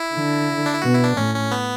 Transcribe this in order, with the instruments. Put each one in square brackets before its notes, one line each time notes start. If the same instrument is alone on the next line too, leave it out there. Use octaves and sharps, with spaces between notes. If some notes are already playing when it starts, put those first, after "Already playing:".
Already playing: [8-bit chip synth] E4
[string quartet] D3
[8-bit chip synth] D4
E4
[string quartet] B2 [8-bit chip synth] F#4
[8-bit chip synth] E4
D4
[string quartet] A2 [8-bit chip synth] C#4
[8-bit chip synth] C#4
B3